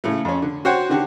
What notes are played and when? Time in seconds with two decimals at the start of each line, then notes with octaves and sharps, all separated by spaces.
0.04 A2 C#3 A3
0.25 F2 C#4
0.42 D3
0.65 F#4 C5 C#5 F#5 G5
0.89 D3 D#3 D4 F#4 G4